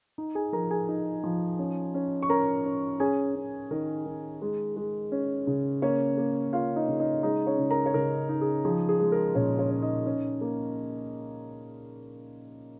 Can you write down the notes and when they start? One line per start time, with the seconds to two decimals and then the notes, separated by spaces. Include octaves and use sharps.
0.18 D#4
0.35 G#4 G#5
0.52 F3 A#4 A#5
0.70 G#4 G#5
0.88 D#4
1.24 F3
1.59 C#4
1.94 C#4
2.23 C#6
2.29 C#4 A#4 A#5
2.65 C#4
3.00 C#4 G#4 G#5
3.35 C#4
3.71 D#3 A#4
4.05 D#3
4.42 G#3
4.77 G#3
5.12 C#4
5.47 C#3
5.82 A#3 C#4 C#5
6.18 A#3
6.53 A#3 F4 F5
6.76 D#4 D#5
6.88 C#3
7.00 D#4 D#5
7.23 G#3 D#4 D#5
7.47 C#4 C#5
7.58 C#3
7.71 A#4 A#5
7.86 C#5
7.94 C#3 A#4
8.29 D#4
8.41 G#4
8.65 F3 G#4
8.89 G#4
9.00 G#3
9.12 A#4
9.35 A#2 C#4 C#5
9.58 C#4 C#5
9.70 C#4
9.82 D#4 D#5
10.06 C#4
10.41 A#3